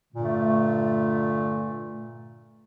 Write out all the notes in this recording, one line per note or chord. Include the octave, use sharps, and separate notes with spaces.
G2 A#2 D3 A3